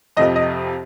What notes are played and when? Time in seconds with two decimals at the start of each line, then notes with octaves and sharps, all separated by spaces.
0.17 F2 C3 F3 D#5
0.36 D#5